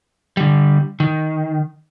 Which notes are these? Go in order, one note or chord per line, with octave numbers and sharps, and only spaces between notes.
D3 G3
D#3